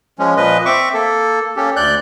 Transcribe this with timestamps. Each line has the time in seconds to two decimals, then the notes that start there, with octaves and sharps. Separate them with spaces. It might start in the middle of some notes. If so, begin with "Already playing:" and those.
0.19 F3 G#3 C#4
0.36 A#2 F3 B4 D#5
0.65 C4 E5 C#6 D6
0.94 A#3 A4
1.56 A#3 C#4 G4 A4
1.76 D2 D5 F#6 G6